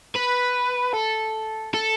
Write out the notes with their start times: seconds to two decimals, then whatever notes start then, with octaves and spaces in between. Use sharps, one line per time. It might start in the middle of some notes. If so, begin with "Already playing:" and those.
0.16 B4
0.94 A4
1.74 A4